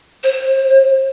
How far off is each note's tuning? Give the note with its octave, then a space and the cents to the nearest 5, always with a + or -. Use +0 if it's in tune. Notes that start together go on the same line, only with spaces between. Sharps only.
C5 +30